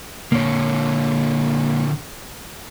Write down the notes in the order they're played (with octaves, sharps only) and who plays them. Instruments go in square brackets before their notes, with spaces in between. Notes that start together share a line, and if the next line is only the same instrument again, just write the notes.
[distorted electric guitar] A#2 D3 [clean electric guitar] A#3 C#5